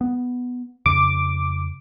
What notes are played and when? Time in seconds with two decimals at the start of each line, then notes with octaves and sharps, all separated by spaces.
0.01 B3
0.86 F2 C#3 D6